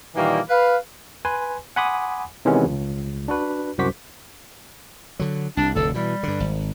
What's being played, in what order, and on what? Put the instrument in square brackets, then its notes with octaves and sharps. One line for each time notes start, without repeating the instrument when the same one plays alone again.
[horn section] A#2 D#3 E3 G3 A#3
B4 F5
[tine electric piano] B4 G#5 C6
F#5 G#5 B5 C6 D6 D#6
C3 D#3 E3 G#3 B3 C#4
C#2
D4 F#4 B4
C2 F#2 F#4 C5 D6 B6
[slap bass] D3 F#3
[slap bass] C2 [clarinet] D4
[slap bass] F1 D2 A2 [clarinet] A4
[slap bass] B2 E3 [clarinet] G3
[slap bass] G2 D3
G#1